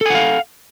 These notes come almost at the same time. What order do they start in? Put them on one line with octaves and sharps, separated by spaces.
A4 G#5 F#5 F5